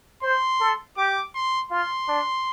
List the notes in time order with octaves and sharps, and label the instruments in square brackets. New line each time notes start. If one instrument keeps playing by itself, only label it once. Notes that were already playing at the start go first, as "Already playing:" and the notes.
[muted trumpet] C5 [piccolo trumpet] C6
[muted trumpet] A4
[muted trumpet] G4 [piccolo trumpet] D6
[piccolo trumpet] C6
[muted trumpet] F4 [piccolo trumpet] C6
[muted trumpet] D4